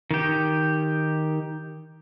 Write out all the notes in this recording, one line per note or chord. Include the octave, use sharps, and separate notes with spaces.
D#3 G4